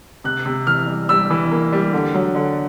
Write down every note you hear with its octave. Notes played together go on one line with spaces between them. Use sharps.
C3 F#6
C3
E3 F6
G3
G3 E6
E3
A#3
G3
D3
F#3
D3